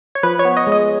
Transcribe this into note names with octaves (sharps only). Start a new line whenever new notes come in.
C#5
F3 B4
C#5
B3
D#5
G#3
D#5